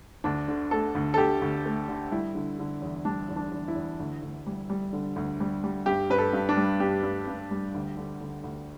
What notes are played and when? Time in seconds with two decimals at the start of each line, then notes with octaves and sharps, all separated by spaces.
0.24 D2 D4
0.48 D3
0.71 A3 A4
0.95 D2
1.14 A4
1.18 D2 G4
1.42 D2
1.66 A3
1.88 D3
2.11 G3 E4
2.35 D3
2.59 D3
2.82 E2
3.05 G3 D4
3.29 E2
3.36 D4
3.52 E2
3.68 E4
3.75 E2
4.00 D2
4.22 D2
4.46 G3
4.70 G3
4.93 D3
5.16 D2
5.40 G3
5.64 G3
5.86 G2 G4
6.10 G2 B4
6.18 A4
6.33 G2
6.49 D4
6.57 G3
6.80 G2 G4
7.03 G2
7.27 G2
7.51 G3
7.74 D2
7.97 D3
8.21 D3
8.44 D2